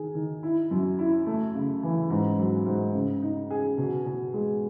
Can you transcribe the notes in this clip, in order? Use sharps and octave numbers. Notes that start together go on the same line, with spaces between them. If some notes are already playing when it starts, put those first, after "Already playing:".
Already playing: D#3 G#4
D#3
E4
F#2
E4
A3
C#3
E3
G#2
F#3
G#2
C#3
D#4
G#4
B2
B2
G#3